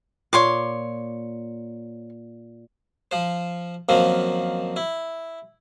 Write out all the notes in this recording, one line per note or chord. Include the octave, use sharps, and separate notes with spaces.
A#2 C#5 C6 D6
F3 C5
F#2 D#3 F3 A#3 C4
E4